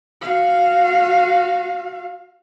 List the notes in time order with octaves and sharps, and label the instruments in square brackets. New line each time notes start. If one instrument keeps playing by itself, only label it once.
[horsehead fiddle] F#4 F5